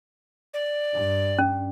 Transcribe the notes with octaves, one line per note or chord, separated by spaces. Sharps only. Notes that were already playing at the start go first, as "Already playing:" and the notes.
D5
G2
C#4